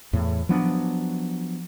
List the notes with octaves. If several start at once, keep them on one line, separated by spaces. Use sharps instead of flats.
E2 A2
F3 F#3 B3 D4